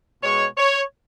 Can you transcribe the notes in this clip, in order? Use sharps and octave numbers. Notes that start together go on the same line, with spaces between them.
B2 G#3 C#5
C#5